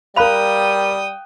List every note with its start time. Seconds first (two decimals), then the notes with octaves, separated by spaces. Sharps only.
0.16 G3 A#4 F5 G5 B5 D#6 F#6 F7